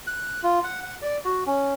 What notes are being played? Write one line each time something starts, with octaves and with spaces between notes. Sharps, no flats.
F#6
F4
F#5
F#5
D5
F#4
C#4